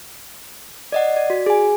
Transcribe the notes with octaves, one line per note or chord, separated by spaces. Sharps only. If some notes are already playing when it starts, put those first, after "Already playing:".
D5 D#5 F#5
D5
F#4
G#4 G#5